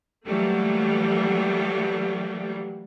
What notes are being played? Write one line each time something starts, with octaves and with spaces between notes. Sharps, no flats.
E3 F#3 G3 A3 A#3